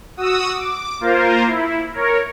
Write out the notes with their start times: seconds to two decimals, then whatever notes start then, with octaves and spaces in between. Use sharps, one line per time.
0.17 F#4 D#6 E6
0.54 D6
1.01 A#3 F4 A#4 C5
1.47 E4
1.93 A#4 C#5